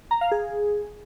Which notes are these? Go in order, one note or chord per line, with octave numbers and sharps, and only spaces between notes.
A#5
F5
G#4